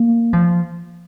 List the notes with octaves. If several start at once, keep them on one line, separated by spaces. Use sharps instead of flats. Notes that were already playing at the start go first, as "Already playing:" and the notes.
Already playing: A#3
F3